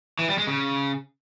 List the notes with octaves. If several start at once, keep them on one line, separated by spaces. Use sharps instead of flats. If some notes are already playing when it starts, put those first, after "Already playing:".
E3
G3
G#3
C#3